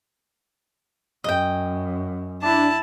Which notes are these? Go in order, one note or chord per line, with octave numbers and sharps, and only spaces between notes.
F#2 D#5 G5
D4 E4 A5